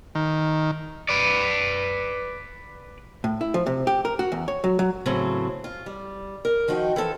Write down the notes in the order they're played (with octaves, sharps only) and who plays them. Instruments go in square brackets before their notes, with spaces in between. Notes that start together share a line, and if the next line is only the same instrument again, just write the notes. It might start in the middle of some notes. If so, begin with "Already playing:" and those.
[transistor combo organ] D#3
[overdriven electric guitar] B4 D5
[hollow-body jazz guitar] A2
E4
F3
C3
G4
A#4
F#4
E2
C#5
F#3
F#3
[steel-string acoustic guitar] A2 C#3 F#3 A3 B3 C4
F4
G3
A#4
D#3 F3 D#4 F#4 G5
E3 F3 A4